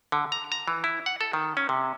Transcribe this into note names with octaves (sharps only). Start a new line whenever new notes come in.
D3
A#5
A#5
E3
E4
F#5
A4
D#3
C#4
C3